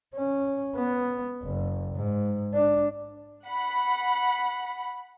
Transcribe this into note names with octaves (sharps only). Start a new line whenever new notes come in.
C#4
B3
F#1
G#2
D4
F#5 B5